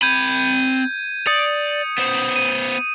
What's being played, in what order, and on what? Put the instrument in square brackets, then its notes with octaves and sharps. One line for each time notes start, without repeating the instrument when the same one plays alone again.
[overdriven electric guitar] C4 B5 [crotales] G6 G#6 D#7
[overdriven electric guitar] D5 [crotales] D#6 C#7
[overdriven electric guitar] B3 C5
[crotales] D#7